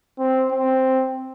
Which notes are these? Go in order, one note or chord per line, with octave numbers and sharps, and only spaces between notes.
C4
C4